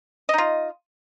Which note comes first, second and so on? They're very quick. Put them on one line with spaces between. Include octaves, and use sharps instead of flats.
D#5 D#4 F4